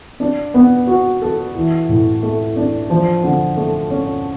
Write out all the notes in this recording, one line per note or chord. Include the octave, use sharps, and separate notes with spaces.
D4
B3
F#4
A4
E3
A2
A3
D4
F3
D3
A3
C#4